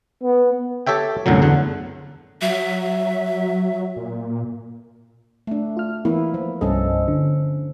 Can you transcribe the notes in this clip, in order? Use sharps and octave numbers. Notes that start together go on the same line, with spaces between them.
B3
G4 A4 C#5 E5 G5
C2 F#2 A2 D3 F#3
E2 D3 F#5
F#3 E5
A#2
A3 D4
F4 F6
E3 A#3 B3 E4
F3
C2 G2 F3 C#4 A4 D#5
D3